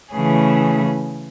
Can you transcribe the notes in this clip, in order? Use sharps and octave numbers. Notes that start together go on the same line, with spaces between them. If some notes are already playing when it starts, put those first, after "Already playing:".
C#3 E3 A3 C#4 G#4